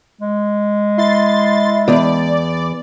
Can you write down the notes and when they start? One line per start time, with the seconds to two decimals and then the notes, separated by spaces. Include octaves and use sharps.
0.21 G#3
0.98 E4 C6 A6
1.88 E2 D5